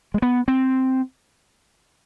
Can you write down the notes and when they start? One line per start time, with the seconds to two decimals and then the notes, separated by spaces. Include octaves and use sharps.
0.14 G#3
0.22 B3
0.48 C4